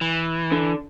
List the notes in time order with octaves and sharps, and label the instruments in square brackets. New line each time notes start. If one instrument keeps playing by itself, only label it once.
[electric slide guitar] E3
[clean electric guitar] D3